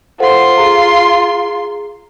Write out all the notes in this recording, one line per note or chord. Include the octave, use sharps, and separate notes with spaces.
F4 A4 C5 F#5 C6
G#4 A#5